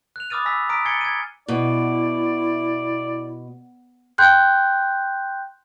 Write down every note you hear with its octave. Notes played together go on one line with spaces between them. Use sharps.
F#6 F7
B5 D6 D#6 F6 A6 D#7
G#5 B5 E6 A#6 B6
A#5 D#6 F6 B6 D7
G#5 G#6 A6 C7 C#7 G7
G#6 D#7
B2 E4 D5
G5 C6 F#6 G6